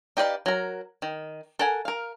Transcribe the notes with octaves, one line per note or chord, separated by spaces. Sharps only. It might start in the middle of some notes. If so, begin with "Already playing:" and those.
D#4 G4 B4 D5 F5
F#3 A#4
D#3
A4 A#4 F#5 G#5
A#4 F5